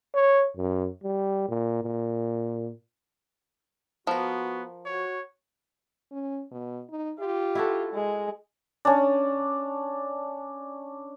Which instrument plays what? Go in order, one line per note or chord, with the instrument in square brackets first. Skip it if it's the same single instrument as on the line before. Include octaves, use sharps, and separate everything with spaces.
[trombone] C#5
F#2
G3
A#2
A#2
[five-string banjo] F3 A#4 [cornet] B3 [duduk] F#4
[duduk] F#4 [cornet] C#5
[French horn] C#4
B2
D#4
[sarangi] F4 [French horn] G4
[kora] E4 F#4 A4
[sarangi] G#3
[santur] C#4 D4